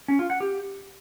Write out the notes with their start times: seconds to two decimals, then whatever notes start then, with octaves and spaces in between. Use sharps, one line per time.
0.08 C#4
0.19 F4
0.30 F#5
0.41 G4